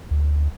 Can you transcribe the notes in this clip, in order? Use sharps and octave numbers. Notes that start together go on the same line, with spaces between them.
D2